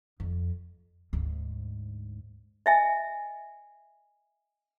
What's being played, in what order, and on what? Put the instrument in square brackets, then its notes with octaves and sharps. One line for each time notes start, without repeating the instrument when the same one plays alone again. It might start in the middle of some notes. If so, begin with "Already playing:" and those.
[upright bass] F2
D2 G#2
[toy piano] D#5 E5 G#5